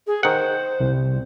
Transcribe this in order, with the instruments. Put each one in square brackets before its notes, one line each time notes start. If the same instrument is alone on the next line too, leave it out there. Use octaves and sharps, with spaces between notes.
[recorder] G#4
[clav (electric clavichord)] D#3 F#5 [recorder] C5
[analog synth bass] C2